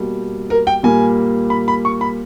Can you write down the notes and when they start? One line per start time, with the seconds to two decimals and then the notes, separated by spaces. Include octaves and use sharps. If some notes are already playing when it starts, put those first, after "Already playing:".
Already playing: B2 G3 A#3
0.50 A#4
0.67 G5
0.83 A#2 G3 A#3 G#5
1.50 B5
1.68 B5
1.85 C#6
2.01 B5